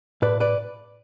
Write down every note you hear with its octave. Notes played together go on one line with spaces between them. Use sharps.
A2 B4 D5
B4 D5